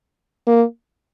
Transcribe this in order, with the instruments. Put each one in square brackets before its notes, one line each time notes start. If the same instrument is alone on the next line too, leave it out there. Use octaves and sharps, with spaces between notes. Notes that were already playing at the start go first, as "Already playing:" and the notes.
[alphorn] A#3